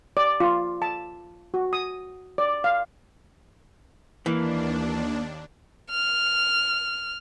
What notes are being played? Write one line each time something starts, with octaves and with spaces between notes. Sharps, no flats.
D5
F4
A5
F#4
D#6
D5
F5
D#2 E3 A#3 D4
F6